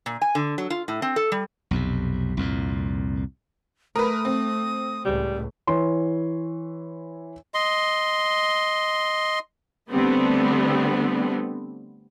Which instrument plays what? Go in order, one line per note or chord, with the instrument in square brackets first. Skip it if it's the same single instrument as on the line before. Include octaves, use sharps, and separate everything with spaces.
[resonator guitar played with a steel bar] A#2
G#5
D3
F#3
F4
A2
C4
A4
G3
[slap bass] B1 F2 C3
C2 F2 A#2
[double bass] A3 [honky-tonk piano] A#4 B4 [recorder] D#6
[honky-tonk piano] C4
[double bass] C#2 A2 [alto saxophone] G3
[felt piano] E3 E4 C#5 C6
[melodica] D#5 C6
[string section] D3 G3 A3 B3 C4